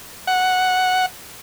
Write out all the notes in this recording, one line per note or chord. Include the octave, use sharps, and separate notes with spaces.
F#5